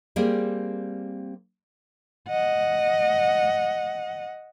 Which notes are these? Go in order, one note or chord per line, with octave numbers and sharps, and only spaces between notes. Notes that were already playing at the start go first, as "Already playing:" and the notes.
G3 A#3 C4 G#4 D5
D#5 F#5